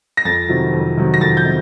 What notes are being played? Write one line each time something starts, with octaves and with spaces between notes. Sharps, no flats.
A#6
F2 A6
C3 D#3 F#3
F2
C3 D#3 F#3
A#6
F2 A6
G6
C3